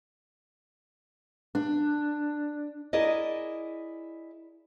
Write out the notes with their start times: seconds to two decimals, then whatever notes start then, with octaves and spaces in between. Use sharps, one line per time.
1.55 D4
2.93 E4 G#4 A#4 D5 D#5